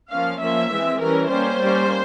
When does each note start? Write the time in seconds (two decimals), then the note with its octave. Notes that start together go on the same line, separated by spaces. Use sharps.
0.11 F3 A#3 C#4 F5
0.41 F3 A#3 C#4 E5
0.71 E3 G#3 C4
1.01 E3 G3 C#4 A#4
1.31 G3 A#3 C#4 C5
1.61 G3 A#3 C#4